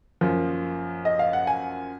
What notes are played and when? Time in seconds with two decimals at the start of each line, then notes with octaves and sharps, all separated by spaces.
0.21 F#2 F3 A#3
1.05 D#5
1.19 F5
1.33 F#5
1.47 G#5